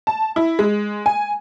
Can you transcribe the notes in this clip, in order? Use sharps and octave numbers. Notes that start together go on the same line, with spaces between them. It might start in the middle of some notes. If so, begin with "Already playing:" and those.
A5
E4
G#3
G#5